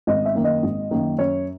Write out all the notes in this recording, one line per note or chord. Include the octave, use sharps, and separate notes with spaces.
G#1 D#5
E5
F#2 D#3 A#3
D#5
G#1
F#2 D#3 A#3
F#2 C#5